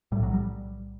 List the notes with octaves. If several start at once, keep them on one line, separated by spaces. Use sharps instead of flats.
B1 A2 G3
F#3
G3